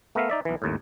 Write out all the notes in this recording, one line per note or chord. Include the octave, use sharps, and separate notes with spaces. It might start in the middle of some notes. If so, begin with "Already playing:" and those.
A3 B3 A#4 E5 F5
D#4 D5 E5
B1 E3
G#1 D#2 A2